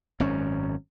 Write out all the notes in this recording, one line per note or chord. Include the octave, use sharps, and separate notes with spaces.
G#1 F#2 C#4